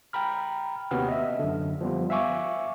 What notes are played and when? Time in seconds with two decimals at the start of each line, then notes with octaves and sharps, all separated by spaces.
0.13 G5 A#5 B5 F6
0.91 D#2 C3 B3 C#4 F#4 F6
1.08 D#5 E5
1.39 F#2 D3
1.81 F3 G3 B3 F4
2.10 E5 F5 G#5 C#6 D6